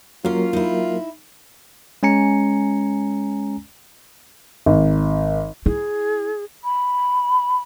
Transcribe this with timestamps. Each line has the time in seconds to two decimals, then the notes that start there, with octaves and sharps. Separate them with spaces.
0.25 F#3 A#3 C#4 F4 A#4 F5
0.53 D#4 E4
2.03 G#3 C#4 G#5 A#5 C#7
4.66 G#1
5.66 E4 G#4
6.64 B5